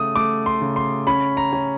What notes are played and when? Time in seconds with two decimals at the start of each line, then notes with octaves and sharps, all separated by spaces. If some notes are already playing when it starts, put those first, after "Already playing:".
Already playing: C#3 A3 D#6
0.16 A3 D6
0.46 C6
0.61 C#3
0.76 C6
1.07 C#4 B5
1.37 A#5
1.53 C#4